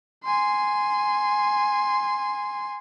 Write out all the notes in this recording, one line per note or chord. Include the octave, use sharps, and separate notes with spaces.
G#5 C6